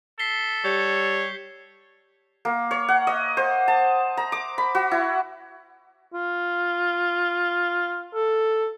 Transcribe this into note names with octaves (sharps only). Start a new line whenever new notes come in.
A4 B6 C7 G7
G3 C#5 G6
A#3
C#5
F#5
D#5
C5
A5
A#5
D6
B5
F#4
E4
F4
A4